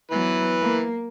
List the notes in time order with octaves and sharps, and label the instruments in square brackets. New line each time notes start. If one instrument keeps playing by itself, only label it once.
[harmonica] E3 B4 [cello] F#3 B3
[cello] A#3